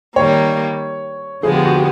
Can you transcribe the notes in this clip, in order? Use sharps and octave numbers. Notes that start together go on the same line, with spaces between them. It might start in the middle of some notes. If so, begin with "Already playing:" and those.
D#3 G3 A#3 C#5
D3 F3 G#3 B3 G#4
G4
F#4
G4